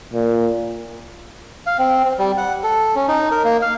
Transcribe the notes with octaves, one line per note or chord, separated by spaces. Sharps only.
A#2
F5
C4
C4
G3
F#5
A4
C#4
D#4
A#4
A#3
F5